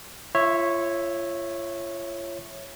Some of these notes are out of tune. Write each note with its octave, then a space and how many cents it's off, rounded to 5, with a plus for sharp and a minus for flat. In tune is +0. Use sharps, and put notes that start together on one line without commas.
F4 -35 C#5 -10 E5 +0